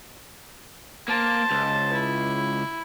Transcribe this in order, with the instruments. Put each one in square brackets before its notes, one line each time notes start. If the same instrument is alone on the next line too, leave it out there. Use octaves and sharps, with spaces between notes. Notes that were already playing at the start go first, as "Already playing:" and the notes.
[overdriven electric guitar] A#3 [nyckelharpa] C5 A5
[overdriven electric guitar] C#2
[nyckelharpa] E4